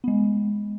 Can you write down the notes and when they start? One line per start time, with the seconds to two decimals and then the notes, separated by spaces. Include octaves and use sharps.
0.04 B3
0.08 G#3